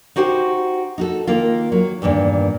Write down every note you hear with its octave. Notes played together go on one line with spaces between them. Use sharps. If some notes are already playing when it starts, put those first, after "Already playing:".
D#4 F#4 G4 C5 F#5
D#4 F#4 A4
D#3 A#3 F4
F#3
E2 G2 A#2 D#3